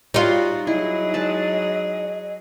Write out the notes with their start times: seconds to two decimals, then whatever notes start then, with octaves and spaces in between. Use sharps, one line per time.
0.14 G3 D#4 F4 F#4
0.67 F#3 E4 G#4 D#5
1.14 G#3 B4 A5